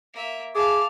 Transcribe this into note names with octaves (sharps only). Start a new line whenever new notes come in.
A#3 E5
G#4 F5 A5 D6